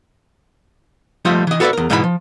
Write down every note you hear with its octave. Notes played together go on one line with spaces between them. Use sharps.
F3 G3 A3 F4 D#5 E5
E3 D#5
F#4 A4 B4 C#5 D5 E5
E2 A#4
G#2 B2 E3 B3 F#4 B5
F3